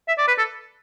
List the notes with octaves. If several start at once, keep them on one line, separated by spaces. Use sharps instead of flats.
E5
D5
B4
A4